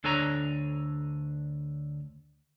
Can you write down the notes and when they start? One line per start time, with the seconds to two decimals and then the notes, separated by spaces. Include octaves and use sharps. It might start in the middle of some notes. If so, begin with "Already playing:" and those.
0.04 D2 D4 A4 C#5 G#5 A#5